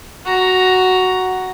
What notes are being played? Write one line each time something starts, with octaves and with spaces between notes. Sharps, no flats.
F#4 A#5